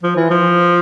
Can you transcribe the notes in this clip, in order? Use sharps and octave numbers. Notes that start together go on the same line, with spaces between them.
F3
E3
F3